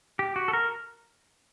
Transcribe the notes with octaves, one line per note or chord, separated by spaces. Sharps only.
G4
F#4
A4
A#4